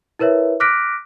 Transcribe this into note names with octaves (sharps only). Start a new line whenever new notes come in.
E4 A#4 B4 C#5 E5
D6 F6 F#6 A#6 B6 D7